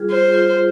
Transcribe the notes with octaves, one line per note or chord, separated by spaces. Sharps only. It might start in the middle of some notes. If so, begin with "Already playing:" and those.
Already playing: G3 F4 G#4
F4 C5
F4